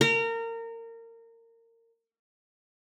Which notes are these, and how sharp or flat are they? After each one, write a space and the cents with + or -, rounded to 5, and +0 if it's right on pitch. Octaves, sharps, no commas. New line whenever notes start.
A#4 -25